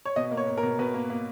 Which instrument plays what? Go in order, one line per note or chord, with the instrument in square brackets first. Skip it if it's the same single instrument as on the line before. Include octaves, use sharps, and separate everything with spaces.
[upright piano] C#5
B2 D#5
A#3
C#5
A#3
A#4
B2
B2 B4
A#3
A#3